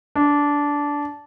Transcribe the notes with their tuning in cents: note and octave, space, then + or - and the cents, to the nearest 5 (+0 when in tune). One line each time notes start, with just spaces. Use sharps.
D4 -15